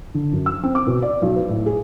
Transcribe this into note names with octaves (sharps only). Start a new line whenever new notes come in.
D3
F#2
E6
C4
D6
B2
D5
B1
B4
A2
G#4